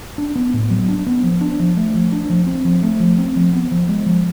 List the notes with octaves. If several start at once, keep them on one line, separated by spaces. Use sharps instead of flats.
D4
B3
A2
F#3
D4
B3
F3
D4
F3
A3
F3
D4
F3
C4
F3
A3
F3
C4
F3
B3
F3
G#3
F3